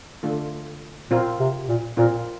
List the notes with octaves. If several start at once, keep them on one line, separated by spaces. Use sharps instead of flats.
D3 A3 D4 F4 A4
A#2 C4 F4 A#4
C3
A#2
A#2 C4 F4 A#4